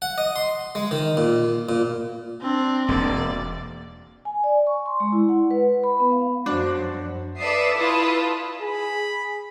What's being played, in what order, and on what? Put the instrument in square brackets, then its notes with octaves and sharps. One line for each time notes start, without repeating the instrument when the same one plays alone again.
[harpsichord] F#5
D#5
C6
G#3
D#3
A#2
A#2
[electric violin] C4 D4
[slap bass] E1 A#3 [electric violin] D5
[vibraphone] G#5
D5
C#6
C6
G#3
E4
F#5
B4
B5
B3
F5
[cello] F#2 F3 [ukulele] D4 [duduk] F#4 [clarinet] C5
[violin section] A4 B4 D5 E5 D#6 C7
E4 F4 B4 A5 D#6
[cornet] G#4 [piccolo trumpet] B5